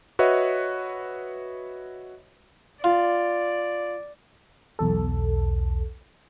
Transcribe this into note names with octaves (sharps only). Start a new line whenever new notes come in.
F#4 B4 C#5 D#5 E5
F4 D5
B1 E2 A4